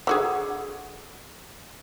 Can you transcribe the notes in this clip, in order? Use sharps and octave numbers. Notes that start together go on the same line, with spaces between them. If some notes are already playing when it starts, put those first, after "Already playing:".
D3 F#4 G#4